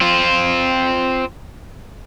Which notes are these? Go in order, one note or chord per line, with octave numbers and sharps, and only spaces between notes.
C4 F4